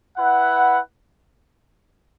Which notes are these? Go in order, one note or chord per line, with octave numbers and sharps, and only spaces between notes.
E4 B4 F#5